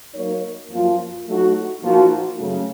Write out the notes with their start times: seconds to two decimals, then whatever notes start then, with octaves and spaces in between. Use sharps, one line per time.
0.14 F#3 A#3 D#4 A#4 C#5
0.69 F#2 F3 A#3 F4
1.26 F#3 A3 D#4 F#4
1.82 A#2 F3 A#3 D#4 F#4
2.38 F#2 C#3 F#3 A3